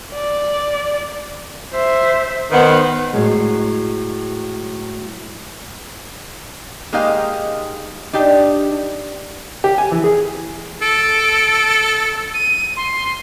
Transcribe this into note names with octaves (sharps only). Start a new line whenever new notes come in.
D5
C5 E5
D#3 B3 C5
A2 F#3 G#3
G#3 A#3 D#4 G4 D#5 F5
D4 D#4 G4
G4
G#5
E3
G#4
A4 D7
D#7
C6